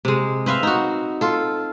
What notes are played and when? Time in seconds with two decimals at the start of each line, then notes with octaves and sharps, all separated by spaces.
0.05 C3 G#3
0.46 C4 B4 E5 F5
0.63 D#4 F#4
1.21 F4 A4